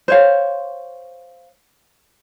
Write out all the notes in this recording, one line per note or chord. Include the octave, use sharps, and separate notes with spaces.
C5 C#5 F5